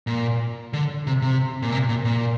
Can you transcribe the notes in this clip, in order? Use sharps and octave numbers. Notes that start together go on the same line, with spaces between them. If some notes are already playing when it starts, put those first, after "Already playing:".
A#2
D3
C3
C3
A#2
C3
A#2
A#2